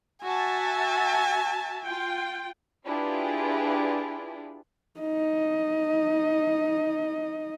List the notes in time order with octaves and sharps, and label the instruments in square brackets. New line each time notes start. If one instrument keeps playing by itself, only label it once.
[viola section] F#4 E5 A5 [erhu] G#5
[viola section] F4 G5
[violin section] D4 E4 F4 G4 G#4 B4
[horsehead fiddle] D#4 D#5